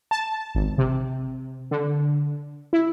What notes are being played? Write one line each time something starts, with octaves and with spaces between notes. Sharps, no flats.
A5
G#1
C3
D3
E4